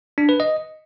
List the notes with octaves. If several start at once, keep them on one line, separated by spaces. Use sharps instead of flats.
D4
B4
D#5